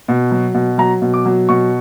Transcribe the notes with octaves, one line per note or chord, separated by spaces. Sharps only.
B2
F#3
B2
F#3 A#5
B2
D6
F#3
B2 C#6